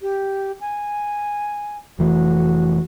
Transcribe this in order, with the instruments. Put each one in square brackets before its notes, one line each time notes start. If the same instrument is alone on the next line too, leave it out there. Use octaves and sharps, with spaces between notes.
[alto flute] G4
G#5
[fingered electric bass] F1 E3 A3 [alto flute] F#4